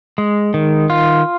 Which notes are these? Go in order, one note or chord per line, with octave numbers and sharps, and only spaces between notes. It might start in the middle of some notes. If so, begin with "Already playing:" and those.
G#3
D#3
F4